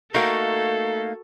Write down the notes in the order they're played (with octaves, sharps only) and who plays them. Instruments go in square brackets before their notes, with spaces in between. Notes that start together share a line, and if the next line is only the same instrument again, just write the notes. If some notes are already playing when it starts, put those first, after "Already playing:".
[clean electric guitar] A3 A#3 D#4 [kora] F#4 A#4 G5 [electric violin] A4 [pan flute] F5